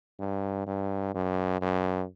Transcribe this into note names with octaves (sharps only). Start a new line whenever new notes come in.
G2
G2
F#2
F#2